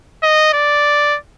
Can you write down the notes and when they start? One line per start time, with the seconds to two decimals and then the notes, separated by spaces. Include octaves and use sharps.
0.23 D#5
0.53 D5